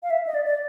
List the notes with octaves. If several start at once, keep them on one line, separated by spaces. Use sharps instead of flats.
F5
E5
D#5
D5
D5